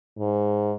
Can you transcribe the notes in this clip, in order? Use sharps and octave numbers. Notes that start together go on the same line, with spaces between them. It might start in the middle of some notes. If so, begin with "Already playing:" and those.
G#2